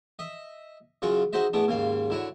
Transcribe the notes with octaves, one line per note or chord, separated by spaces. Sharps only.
D#5 E5
F#2 C#3 F4 F#4 G#4 C#6
D#4 F#4 G#4 C5 D#5 E5
A2 G#3 A3 B3 D4
D#2 G#2 C#3 F5 C6
D3 E4 F#4 C#5